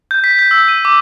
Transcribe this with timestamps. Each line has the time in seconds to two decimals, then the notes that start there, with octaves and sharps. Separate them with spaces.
0.11 G6
0.24 B6
0.39 G6
0.51 E6
0.68 D#7
0.85 D6